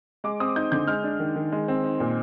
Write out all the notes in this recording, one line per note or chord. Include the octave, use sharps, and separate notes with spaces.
G#3 D6
C4 D#6
D#4 G6
D3 G6
G#3 F6
D4
D#3
D#3
G#3
C4
D#4
A#2